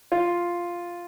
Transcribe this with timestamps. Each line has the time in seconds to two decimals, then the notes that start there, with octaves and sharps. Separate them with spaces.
0.12 F4